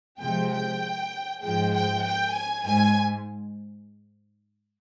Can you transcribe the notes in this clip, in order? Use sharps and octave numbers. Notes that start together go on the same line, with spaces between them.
C3 F3 G#3 G5
G5
G#2 F3 G#3 G5
G5
G5
G#5
G#2 G#5